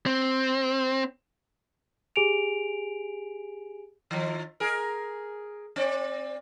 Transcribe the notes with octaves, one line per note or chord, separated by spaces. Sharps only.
C4
G4 G#4 G#5 D7 F7
D#3 F3
G#4 A#4
C4 D5